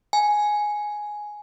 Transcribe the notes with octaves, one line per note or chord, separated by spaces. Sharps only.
G#5